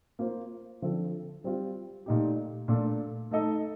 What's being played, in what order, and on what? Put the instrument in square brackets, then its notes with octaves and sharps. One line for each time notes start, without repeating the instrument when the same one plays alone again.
[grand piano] A#3 F4 C5
D3 F3 C4 F4 A4
G3 C4 F4
A#2 A3 D#4 G4
A#2 A3 D4 A4
A3 D#4 A4 D#5